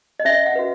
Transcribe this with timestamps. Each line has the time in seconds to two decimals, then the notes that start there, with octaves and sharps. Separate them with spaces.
0.20 D#5
0.25 C#4 E5
0.46 F#5
0.55 F#4 B4